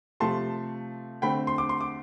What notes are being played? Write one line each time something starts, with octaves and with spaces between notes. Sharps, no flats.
C3 F3 A3 A5 C6
D3 A3 C4 G5 B5
C6
D6
C6
D6